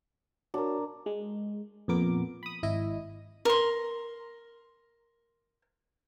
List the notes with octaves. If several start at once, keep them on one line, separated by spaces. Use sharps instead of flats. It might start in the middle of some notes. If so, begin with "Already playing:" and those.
D4 F#4 A#4 C#5
G#3
F2 A#2 B3 A#4 D6
B5 D#6
G#1 E4 D#5
A#4 C6